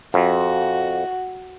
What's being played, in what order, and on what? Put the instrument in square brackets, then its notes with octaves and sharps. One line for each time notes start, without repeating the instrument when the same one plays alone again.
[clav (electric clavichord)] F2 [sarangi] F#4